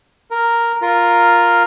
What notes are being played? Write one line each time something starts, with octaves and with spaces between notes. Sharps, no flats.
A#4
F4 A#4